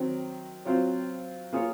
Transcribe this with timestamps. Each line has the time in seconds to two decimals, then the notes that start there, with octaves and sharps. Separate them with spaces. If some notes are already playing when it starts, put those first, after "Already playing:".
Already playing: D#3 F#3 C4
0.65 F#3 C4 F4 C5
1.53 A#3 F4 G#4 C#5